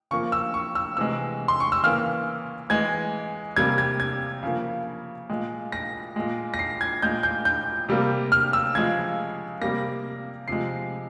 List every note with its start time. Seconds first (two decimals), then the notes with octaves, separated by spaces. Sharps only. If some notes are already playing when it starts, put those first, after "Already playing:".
0.11 C#3 F3 A#3 C#6
0.32 E6
0.54 C#6
0.75 E6
0.97 C3 E3 G#3 E6
1.48 C6
1.60 C#6
1.72 E6
1.83 C#3 E3 A#3 F6
2.70 E3 G#3 G#6
3.56 C3 G3 A#3 G#6
3.78 G#6
4.00 G#6
4.43 C#3 F3 A#3
5.30 A#2 G#3
5.72 A#6
6.16 A#2 G#3
6.54 A#6
6.59 C7
6.81 G#6
7.02 A#2 G#3 G6
7.23 G6
7.45 G6
7.89 C3 G3 A#3
8.32 F6
8.53 E6
8.75 C#3 F3 G#3 G#6
9.61 C3 G3 A#3 A#6
10.48 C3 F3 G#3 C7